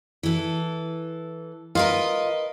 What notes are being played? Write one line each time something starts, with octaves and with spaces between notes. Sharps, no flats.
E3 A4
F4 A#4 B4 D#5